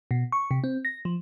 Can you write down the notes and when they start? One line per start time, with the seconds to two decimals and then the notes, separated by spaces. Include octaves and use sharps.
0.11 B2
0.32 C#6
0.51 C3
0.64 C4
0.85 A#6
1.05 F3